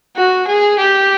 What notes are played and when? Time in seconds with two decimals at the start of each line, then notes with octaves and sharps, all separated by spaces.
0.16 F#4
0.47 G#4
0.79 G4